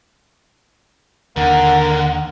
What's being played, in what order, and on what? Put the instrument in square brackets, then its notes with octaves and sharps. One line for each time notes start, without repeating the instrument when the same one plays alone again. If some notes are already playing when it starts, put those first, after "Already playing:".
[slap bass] D#2 [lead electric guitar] D3 [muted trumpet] A#4 [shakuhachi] F#5